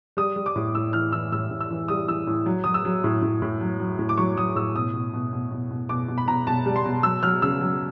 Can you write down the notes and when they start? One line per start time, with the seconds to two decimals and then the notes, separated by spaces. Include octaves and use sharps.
0.17 G3 D#6
0.36 G3
0.46 D6
0.56 A2
0.75 A2 E6
0.93 E3 F6
1.12 E3 E6
1.32 A2 E6
1.51 A2
1.60 E6
1.71 E3
1.88 G3 D#6
2.08 E3 E6
2.27 A2
2.46 F#3
2.64 F#3 D#6
2.74 E6
2.85 F#3
3.04 A2
3.22 A2
3.42 A2
3.61 F#3
3.80 F#3
3.99 A2
4.09 D6
4.18 F#3 C#6
4.37 F#3 D#6
4.55 A2 E6
4.75 B2 D#6
4.94 B2
5.13 B2
5.33 B2
5.51 B2
5.71 B2
5.89 B2 D6
6.08 B2
6.18 B5
6.28 B2 A#5
6.47 B2 A5
6.66 G3
6.76 C6
6.85 B2
7.03 F#3 E6
7.23 F#3 F6
7.42 C#3 E6
7.61 F#3